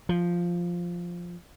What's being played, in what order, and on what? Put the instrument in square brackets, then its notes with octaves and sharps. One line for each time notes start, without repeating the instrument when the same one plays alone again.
[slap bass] F3